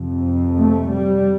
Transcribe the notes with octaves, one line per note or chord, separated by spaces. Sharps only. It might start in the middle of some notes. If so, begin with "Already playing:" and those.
Already playing: F2 C3
A3
G3